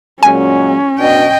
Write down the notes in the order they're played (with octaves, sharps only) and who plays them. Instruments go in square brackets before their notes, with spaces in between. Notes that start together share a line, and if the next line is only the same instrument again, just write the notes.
[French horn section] A#2 F#3 G#3 [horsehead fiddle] C#4 [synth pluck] G#5
[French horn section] B2 D4 [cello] D#5 G5